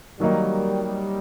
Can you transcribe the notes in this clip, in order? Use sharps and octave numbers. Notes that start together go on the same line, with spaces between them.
D#3 F#3 G3 A#3 D#4
G3